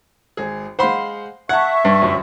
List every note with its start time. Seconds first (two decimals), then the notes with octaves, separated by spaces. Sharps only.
0.37 G#1 G#4
0.79 G#3 C5 F5 F#5 B5 C6
1.49 E5 F#5 A5 C#6 G#6
1.85 G2
2.02 G1 C2 F#2